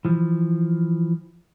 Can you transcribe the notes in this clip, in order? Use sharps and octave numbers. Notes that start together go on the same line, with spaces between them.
E3 F3